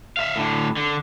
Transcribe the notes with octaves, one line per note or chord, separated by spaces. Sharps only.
E5 F5
A2 D3
D3